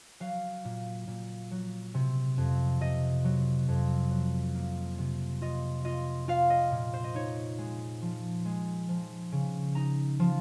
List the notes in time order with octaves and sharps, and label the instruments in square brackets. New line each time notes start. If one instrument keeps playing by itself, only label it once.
[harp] F#3 F5
A#2
A#2
F#3
C3
F2
C3 D#5
F#3
F2
F#3
A#3
C3
F4 D#5
F4 D#5
F4 F5
D#5
A#2
C5
D#5
D#4 C#5
G#3
F3
G#3
F3
C#3
D#4 A#5
F3